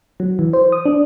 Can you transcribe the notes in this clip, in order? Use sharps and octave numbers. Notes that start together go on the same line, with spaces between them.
F#3
E3
C5
D#6
D4